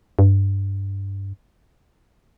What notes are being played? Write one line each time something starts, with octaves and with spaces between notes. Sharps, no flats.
G2